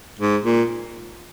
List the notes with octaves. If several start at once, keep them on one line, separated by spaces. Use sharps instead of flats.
G#2
A#2